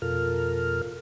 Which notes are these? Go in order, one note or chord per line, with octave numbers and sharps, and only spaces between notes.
F2 B2 F4 A4 A#4 F6